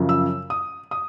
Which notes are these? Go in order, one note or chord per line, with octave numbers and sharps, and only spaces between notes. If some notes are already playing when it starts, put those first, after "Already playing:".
Already playing: F#2 C#3 F3
E6
D#6
D#6